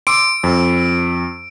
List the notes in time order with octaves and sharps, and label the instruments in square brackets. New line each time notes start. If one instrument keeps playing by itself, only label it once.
[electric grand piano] C6 D6 E6 [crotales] D7
[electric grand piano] F2